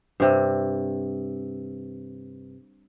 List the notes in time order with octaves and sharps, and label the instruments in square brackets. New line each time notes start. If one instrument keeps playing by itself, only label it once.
[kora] G2 C3